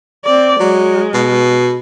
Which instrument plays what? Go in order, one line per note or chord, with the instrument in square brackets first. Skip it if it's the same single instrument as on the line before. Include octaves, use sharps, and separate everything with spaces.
[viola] C4 D5
[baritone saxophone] F#3 [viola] G#3
[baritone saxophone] B2